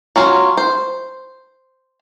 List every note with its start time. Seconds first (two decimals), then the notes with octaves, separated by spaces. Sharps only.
0.16 F#3 C#4 F4
0.57 C5